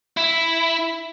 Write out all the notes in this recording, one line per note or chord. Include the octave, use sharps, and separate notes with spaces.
E4